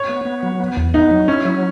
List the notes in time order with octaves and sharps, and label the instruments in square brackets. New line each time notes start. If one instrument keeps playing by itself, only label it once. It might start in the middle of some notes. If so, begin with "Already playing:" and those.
Already playing: [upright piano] C#5
[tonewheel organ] B3
B3
F#3
B3
E2
[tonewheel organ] B3 [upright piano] D#4
[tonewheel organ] F#3
[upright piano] C#4 [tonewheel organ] E4
[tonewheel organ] F#3